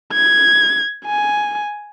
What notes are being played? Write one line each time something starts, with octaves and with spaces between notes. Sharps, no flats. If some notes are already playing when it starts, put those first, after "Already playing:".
G#6
G#5